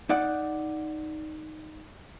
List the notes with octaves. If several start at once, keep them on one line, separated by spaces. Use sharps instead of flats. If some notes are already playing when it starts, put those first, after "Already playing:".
D#4 D5 F#5